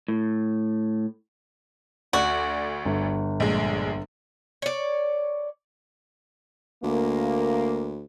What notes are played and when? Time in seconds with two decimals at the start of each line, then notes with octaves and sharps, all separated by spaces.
0.08 A2
2.13 D2 F#4 D5
2.86 G1
3.40 A#1 G#3
4.62 C#5 D5
6.83 D2 A#3